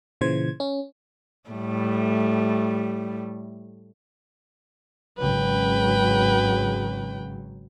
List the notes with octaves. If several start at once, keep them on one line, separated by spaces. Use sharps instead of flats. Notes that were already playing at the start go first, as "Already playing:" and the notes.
A#2 C#3 E3 C5 G#6
C#4
A2 G3 A3
G#1 C#3 F#3 B4 G5